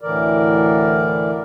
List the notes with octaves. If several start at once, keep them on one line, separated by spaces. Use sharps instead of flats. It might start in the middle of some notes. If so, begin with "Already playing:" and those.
D2 A2 D3 E3 A#4 D5